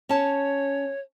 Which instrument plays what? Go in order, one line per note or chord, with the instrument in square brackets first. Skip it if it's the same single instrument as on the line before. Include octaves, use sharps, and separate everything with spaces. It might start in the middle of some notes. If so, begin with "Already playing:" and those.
[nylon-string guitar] C#4 A5 [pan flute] C#5